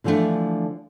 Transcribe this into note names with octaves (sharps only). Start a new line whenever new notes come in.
D3 E3 F3 G3 A3 D4